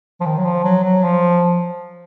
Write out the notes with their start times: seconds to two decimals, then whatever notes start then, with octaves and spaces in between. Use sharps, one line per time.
0.20 F3
0.26 D#3
0.37 F#3
0.45 F3
0.64 F#3
0.84 F#3
1.04 F3